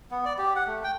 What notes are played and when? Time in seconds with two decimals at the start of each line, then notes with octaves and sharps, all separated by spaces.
0.11 B3
0.25 D5
0.38 G4
0.56 F#5
0.67 A3
0.84 G5